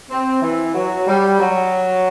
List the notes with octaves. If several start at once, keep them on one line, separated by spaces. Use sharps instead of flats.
C4
E3
F#3
G3
F#3